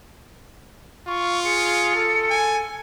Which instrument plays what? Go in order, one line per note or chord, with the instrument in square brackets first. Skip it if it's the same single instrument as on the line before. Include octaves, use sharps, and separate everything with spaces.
[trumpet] F4 [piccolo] C#6
[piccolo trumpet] G#4 [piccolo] C#7
[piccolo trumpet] A4
[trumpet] G#5